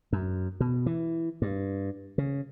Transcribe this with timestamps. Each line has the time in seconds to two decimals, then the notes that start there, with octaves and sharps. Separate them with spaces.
0.13 F#2
0.60 B2
0.86 E3
1.42 G2
2.18 C#3